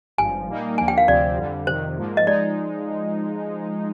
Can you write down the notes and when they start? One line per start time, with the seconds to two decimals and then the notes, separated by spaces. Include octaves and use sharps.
0.18 G#1 G2 F3 G#5
0.48 A#2 G3 A#3 D#4
0.78 D#2 D3 F3 A#3 G#5
0.88 G5
0.98 F5
1.08 D2 C3 F3 C4 G4 D5
1.37 F2 D3 G3
1.67 F2 C3 D#3 C5
1.98 G#2 F3 A#3
2.17 D#5
2.27 F3 G#3 D#4 D5